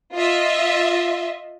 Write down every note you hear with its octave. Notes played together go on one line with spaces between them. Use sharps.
F4 D#5 E5